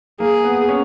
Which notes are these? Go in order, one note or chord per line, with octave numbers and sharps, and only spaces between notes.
A#3 G#4
B3
C#4